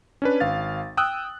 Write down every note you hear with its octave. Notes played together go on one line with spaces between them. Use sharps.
C#4 D4 B4
G#1 F5 A6
G5 D#6 E6 F#6